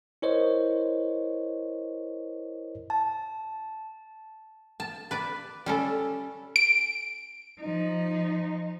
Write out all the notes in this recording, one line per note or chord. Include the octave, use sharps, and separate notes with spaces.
E4 A#4 C5 C#5 D#5
A5
A5
B4 D5
G3 C#4 A4
D7
F3 D#4